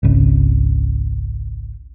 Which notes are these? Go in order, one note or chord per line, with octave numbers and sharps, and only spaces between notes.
G#1 C#2